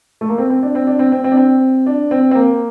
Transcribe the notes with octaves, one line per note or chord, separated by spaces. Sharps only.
A3
A#3
C4
C4
D4
C4
D4
C4
C4
C4
D4
C4
D4
C4
C4
A#3